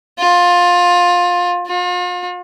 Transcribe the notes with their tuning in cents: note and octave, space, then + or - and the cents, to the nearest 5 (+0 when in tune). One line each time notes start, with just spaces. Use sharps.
F4 +20
F4 +40